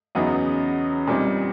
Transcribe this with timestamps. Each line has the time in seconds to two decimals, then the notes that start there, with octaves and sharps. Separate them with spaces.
0.15 E2 C#3 F#3 B3 D#4
1.07 A#2 G3 C4 D#4